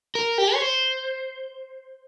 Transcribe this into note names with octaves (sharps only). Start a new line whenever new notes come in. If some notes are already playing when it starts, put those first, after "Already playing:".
A#4
G4
C#5
C5